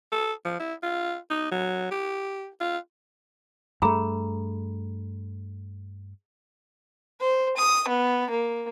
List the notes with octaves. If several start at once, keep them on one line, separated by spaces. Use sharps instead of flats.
A4
F3
E4
F4
D#4
F#3
G4
F4
G2 A3 G#4 A#5 B5
C5
D#6
B3
A#3